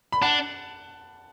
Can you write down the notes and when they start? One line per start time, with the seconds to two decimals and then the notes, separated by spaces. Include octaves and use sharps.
0.12 B5
0.22 D4 F#5 A5